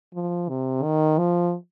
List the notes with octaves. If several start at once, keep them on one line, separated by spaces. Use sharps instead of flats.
F3
C3
D#3
F3